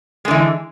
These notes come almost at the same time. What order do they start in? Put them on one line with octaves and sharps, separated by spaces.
G#3 D3 E3